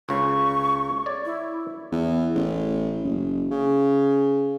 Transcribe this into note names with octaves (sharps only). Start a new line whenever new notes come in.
C#2 C#3 C#6
C#5 D5
E4
E2
A1
F#1
C#3